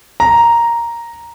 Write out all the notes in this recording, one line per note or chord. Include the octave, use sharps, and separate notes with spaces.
A#5